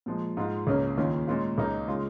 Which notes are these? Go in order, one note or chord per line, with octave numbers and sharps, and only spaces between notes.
A#2 F3 G#3
G#2 G#3 F4
C#2 C#3 A#3 C#4
D#2 D#3 C#4 F4
A#2 G#3 C#4 F4
C#2 C#3 A#3 D#4
C#3 G#3 F4